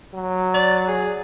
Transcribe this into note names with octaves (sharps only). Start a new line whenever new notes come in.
F#3
D5
G#4